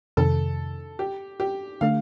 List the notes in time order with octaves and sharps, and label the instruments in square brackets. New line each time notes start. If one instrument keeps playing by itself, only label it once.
[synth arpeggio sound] F2 C3 D#3 [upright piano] A4
[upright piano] G4
G4
[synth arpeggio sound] D3 A3 D4 [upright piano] F5